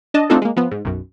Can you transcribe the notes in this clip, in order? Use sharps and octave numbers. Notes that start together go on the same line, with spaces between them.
D4 D#5 A5
A3 C4 D4 D#4 F4 A4
G#3 A#3
F3 B3
G#2
B1 F#2